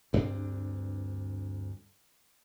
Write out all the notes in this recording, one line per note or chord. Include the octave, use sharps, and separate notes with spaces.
D2 G2 C4 D4